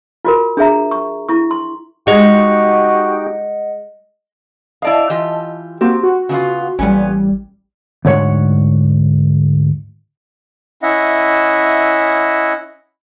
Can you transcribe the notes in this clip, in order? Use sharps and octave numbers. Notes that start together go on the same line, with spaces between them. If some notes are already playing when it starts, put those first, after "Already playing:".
F4 F#4 A#4
D4 G#4 E5 A#5
C#6
E4 C#6
C6
G#3 D#4 F#4 G4 D#5 F#5
E4 D5 D#5 F5 A5
E3 F4 G4
A#3 C4 F#4 G4
F#4
C#3 B3 F4
A1 A#2 G3 B3 C#4
D2 G#2 C#5 F#5
C#4 E4 D#5 E5 F#5